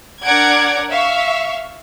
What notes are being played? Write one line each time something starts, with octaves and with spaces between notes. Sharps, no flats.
D4 A#4 D5 F#5 G#6 D7
E5 F5 C#6